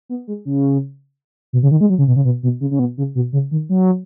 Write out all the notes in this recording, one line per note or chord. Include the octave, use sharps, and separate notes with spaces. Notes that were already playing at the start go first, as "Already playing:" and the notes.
B3
G#3
C#3
B2
C#3
D#3
G#3
F#3
C#3
B2
C#3
B2
B2
C#3
C#3
B2
C#3
B2
C#3
D#3
F#3